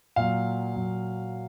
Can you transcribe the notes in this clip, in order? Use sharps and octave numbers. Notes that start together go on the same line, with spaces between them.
A#2 F#3 F5
A#2 F#3